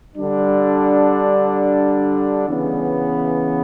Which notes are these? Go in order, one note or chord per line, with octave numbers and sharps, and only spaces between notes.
D3 G3 D4
C#3 E3 B3